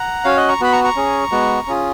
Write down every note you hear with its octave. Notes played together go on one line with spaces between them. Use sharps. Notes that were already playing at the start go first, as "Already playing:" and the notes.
Already playing: F#5 A#5
C#4 F#4 C#5 F5
D#5 F#5
A#5 C#6
B3 F#4 B5
A#5 C#6
A#5 C#6
C#4 G#4
G#3 B3 F#4
C#4 F4 G#4